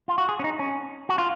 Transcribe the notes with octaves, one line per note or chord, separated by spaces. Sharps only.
F4
F#4
G#4
C#4
D#4
C#4
F#4
F4